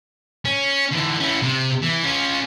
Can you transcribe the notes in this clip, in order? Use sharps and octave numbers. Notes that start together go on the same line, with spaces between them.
C#4
D3 E3
E3 C#4
C3
E3
C#4 F4